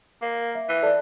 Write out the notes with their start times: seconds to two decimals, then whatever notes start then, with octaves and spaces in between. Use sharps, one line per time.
0.22 A#3
0.55 E5
0.69 E3
0.83 A4 D5 A5